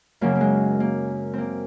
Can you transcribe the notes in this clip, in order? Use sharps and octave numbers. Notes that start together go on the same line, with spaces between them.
F#2 C#3 F#3 A#3
A#3
G#3
A#3
A#3 C4